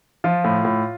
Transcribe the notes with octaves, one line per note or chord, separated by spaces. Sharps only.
F3 F4
A2
A2